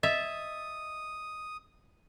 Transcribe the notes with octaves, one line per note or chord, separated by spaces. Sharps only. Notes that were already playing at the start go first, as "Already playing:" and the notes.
D#5 E5 D#6 A6